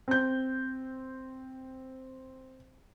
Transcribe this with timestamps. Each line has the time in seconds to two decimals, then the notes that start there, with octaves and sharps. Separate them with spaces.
0.08 C4 G6